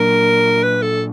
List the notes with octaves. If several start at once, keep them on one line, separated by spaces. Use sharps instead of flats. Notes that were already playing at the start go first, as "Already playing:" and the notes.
Already playing: A#2 F#3 A#3 D4 A#4
B4
A4